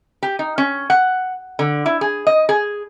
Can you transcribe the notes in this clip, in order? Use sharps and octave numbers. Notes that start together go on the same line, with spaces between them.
G4
D#4
C#4
F#5
D3
E4
G#4
D#5
G#4